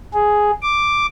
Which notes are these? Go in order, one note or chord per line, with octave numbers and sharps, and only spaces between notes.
G#4
D6